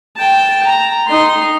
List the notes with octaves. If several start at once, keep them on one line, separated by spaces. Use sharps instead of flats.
G5 A5
A#5
D#4 C6